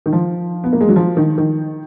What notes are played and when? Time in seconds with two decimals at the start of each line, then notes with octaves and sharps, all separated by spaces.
0.06 D#3
0.13 F3
0.64 B3
0.73 A#3
0.81 G#3
0.89 F#3
0.96 F3
1.17 D#3
1.38 D#3